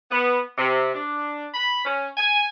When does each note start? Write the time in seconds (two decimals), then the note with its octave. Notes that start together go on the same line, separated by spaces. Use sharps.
0.11 B3
0.57 C3
0.94 D4
1.54 B5
1.85 C#4
2.17 G#5